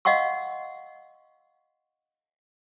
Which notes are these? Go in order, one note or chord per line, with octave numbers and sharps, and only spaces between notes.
D#5 F5 F#5 C6 C#6